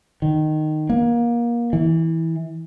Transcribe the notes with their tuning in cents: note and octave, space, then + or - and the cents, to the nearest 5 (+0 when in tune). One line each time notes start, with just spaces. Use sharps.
D#3 -15
A#3 +25
E3 -20